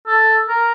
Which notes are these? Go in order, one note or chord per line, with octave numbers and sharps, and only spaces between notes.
A4
A#4